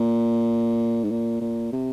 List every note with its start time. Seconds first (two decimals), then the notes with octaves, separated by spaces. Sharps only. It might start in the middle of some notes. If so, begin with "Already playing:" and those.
Already playing: A#2
1.04 G#2
1.11 A#2
1.41 A#2
1.72 C3